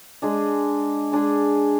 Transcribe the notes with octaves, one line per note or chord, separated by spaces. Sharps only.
G#3 D4 G#4
G#3 D4 G#4